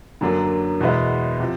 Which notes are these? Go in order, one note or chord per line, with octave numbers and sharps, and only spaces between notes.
F#2 D3 F#3 A#3 D4
E2 B2 G#3 B3 E4
C3 F3